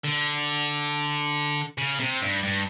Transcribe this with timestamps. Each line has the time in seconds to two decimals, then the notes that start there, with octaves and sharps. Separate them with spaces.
0.04 D3
1.78 C#3
2.00 C3
2.22 G2
2.43 G2